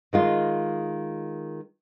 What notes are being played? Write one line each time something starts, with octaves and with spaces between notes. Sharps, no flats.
D#3 G#3 F4